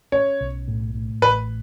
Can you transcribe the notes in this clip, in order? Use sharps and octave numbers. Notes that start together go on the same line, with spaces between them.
C#4 C#5
B1
A2
A2
A1 B4